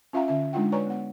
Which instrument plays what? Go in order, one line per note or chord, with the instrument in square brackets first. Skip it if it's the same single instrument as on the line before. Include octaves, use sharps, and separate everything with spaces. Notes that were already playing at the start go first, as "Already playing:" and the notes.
[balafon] C#4 F4 E5 F5 G5 A#5
D3 C#4 E5
G#3 D4 D#4 F4 F#5 G5
B4 C#5 D5 G#5 A#5 C#6
B3 F#5